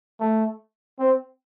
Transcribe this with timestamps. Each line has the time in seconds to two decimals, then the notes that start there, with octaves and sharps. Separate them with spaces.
0.20 A3
0.99 C4